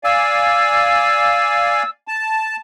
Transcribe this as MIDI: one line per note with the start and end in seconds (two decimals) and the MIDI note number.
0.04 1.83 74
0.04 1.83 77
0.04 1.83 80
0.04 1.89 88
2.08 2.56 81